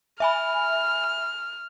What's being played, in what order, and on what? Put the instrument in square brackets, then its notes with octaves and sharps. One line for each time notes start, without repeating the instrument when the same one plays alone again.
[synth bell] E5 G#5 B5 [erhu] F6